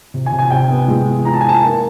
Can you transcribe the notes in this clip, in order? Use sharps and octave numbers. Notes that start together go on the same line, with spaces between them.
C3
G#5
C3
G#5
C3 G5
B3
G#3
E3
E3 A#5
A5
G#5
E3 A5
A#3